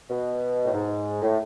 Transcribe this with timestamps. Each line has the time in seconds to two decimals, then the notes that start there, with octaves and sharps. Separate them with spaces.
0.10 B2
0.65 A2
0.73 G#2
1.22 A2